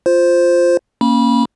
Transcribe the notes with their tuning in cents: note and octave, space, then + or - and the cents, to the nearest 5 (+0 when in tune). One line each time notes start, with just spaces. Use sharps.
F4 +0 C5 +0
A#3 +0 C#4 -10 B5 -25